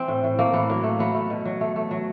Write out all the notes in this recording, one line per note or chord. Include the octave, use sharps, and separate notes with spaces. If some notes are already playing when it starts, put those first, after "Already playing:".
Already playing: E3 C4
A2
A2
A3 A#3
A2 B3
F#3 A#3
A3
F#3 B3
A3
B2
F#3
A3
A3
F#3